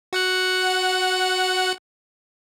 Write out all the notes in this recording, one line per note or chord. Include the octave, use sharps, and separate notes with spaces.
F#4 F#5 F#6